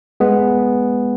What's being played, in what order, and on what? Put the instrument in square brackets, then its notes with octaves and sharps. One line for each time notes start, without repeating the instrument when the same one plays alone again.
[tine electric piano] G#3 B3